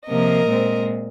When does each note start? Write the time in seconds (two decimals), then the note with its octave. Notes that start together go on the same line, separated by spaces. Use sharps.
0.08 C3 F3 A#3 A#4 D#5
0.47 A#2 G#3 C4